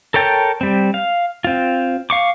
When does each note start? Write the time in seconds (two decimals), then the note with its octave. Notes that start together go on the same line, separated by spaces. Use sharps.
0.14 A4 A#4 C#5 G5 A5
0.61 G3 C4
0.94 F5
1.44 C4 F4
2.10 F5 C#6 D6